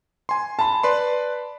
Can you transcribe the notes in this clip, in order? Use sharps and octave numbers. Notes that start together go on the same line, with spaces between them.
G#5 C6
A5 B5
B4 D5 C6